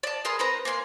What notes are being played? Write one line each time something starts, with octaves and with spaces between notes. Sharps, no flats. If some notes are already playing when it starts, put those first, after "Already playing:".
D5 A5
G#4 A#4 B4 C6
C4 A#4 B4 A#5
A#3 G#5 A#5 C6